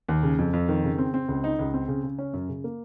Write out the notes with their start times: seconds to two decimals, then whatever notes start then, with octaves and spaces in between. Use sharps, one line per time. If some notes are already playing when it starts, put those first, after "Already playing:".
0.08 D#2
0.23 C#3
0.38 F2
0.53 F2
0.69 D#3
0.84 C#3
0.98 C4
1.14 C4
1.29 C#2
1.44 D#4
1.59 C#2
1.74 C4
1.88 C#3
2.04 C#3
2.19 C#4
2.33 F#2
2.49 C#3
2.64 A#3